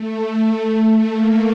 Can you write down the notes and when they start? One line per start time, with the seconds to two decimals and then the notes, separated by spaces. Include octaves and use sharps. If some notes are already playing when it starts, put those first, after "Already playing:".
Already playing: A3
1.09 A#3